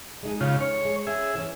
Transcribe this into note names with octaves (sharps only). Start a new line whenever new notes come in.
G#3 D#4 G#4
C#3 F4
C#5
G#3
C#4 G#4 E5
E3 C#4